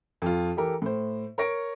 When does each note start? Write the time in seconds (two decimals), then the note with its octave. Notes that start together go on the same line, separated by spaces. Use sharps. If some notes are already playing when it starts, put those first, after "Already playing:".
0.22 F2 F4
0.57 E3 G4 A4 A#4
0.82 A2 C5
1.38 A#4 C#5 A#6 D7